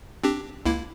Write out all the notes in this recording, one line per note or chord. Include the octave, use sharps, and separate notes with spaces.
C4 D4 G4
C#2 A#3 E4